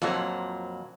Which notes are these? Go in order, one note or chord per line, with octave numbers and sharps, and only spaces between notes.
F2 A#2 F3 F#3 A4